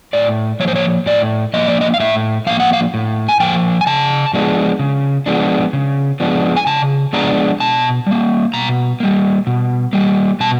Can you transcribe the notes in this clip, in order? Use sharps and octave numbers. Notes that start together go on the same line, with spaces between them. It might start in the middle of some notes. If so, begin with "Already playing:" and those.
A2 D5
F3 A#3 C#5
C5
C#5
A2 D5
F3 A#3 D#5
D5
D#5
F5
A2 E5
F3 A#3 F5
F#5
F5
A2
G#5
F3 A#3 G5
G#5
C#3 A5
F3 G#3 B3 D4
C#3
F3 G#3 B3 D4
C#3
F3 G#3 B3 D4
G#5
C#3 A5
F3 G#3 B3 D4 A#5
B2 A5
G3 A#3
B2 A#5
G3 A#3
B2
G3 A#3
B2 A5